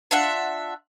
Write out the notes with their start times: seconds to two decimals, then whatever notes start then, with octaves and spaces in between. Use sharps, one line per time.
0.11 D4 F4 E5 F#5